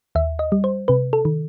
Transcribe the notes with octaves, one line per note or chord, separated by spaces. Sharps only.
D#2 E5
D#5
G3
C5
C3 B4
A4
D#3